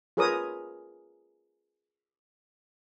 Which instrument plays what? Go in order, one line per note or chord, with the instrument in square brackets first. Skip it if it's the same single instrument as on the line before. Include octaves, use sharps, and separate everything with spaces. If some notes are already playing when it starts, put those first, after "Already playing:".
[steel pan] F4 G#4 A#4 B4 C#5 D#6